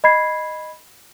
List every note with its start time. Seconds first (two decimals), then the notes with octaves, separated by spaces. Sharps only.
0.04 D#5 B5 G#6 C7